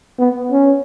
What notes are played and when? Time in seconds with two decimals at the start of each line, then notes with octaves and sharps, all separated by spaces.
0.19 B3
0.52 C#4